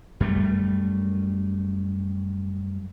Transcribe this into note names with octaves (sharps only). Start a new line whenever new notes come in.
F#2 G3 A3